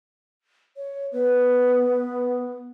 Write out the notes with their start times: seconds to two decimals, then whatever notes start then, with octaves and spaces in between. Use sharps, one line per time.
0.77 C#5
1.13 B3 B4